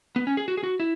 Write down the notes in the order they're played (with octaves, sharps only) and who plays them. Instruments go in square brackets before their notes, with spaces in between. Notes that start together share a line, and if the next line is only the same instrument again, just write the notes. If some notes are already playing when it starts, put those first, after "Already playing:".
[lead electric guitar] B3
C#4
G#4
F#4
G#4
F#4
E4